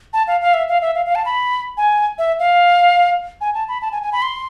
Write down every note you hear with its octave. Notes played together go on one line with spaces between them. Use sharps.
A5
F5
F5
E5
F5
E5
F5
F5
A5
B5
G#5
E5
F5
G#5
A5
B5
A5
G#5
G#5
B5
C6